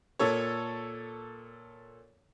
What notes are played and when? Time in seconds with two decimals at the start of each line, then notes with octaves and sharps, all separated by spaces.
0.19 A#2 A4 C#5